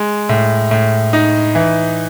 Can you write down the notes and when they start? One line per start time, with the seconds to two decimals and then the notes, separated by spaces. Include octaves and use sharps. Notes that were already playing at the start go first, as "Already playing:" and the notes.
Already playing: G#3
0.29 A2
0.71 A2
1.13 D#4
1.55 E3